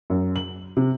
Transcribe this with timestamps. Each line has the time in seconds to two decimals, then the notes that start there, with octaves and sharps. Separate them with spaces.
0.10 F#2
0.36 F#7
0.77 C3